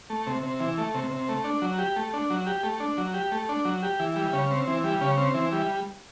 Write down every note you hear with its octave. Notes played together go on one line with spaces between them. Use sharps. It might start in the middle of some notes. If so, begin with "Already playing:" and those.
A3
C3
C3
E3
A3
C3
C3
A3
D4
F#3
G4
A3
D4
F#3
G4
A3
D4
F#3
G4
A3
D4
F#3
G4
E3
G3
C#3
C4
E3
G3
C#3
C4
E3
G3